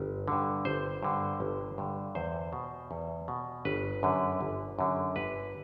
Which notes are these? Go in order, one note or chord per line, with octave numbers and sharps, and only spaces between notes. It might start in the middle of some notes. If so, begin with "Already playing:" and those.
Already playing: G1
G2 D3
G1 C5
G2 D3
G1
G2 D3
E2 C5
B2
E2
B2
G1 B4
F#2 D3
G1
F#2 D3
G1 B4